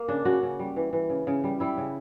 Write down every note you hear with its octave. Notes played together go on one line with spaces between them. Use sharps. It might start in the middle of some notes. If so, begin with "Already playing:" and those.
Already playing: A#3
C#3 D4
C#3 F#4
C#3
G3
E3
E3
C#3
C#3
G3
G3 E4
C#3